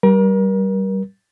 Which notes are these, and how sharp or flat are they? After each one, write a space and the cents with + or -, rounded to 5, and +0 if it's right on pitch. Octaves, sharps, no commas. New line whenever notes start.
G3 -20 A#4 +35